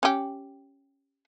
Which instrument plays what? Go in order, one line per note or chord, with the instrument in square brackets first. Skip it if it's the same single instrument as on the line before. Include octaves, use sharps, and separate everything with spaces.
[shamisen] C#4 G4